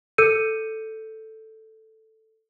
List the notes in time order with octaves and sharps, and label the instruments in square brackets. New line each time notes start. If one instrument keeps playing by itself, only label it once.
[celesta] A4 E6 G6 C#7 D#7